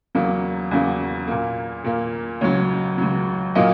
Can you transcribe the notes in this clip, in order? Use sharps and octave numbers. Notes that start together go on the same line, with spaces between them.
E2 C#3 F#3 A#3
E2 C#3 F#3 A#3
A#2 A#3
A#2 A#3
C#2 C#3 F#3 C#5
C#2 C#3 F#3
A#2 F#3 A#3 D#5